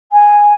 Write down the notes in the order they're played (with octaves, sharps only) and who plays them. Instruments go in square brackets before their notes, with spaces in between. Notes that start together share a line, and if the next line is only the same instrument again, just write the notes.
[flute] G#5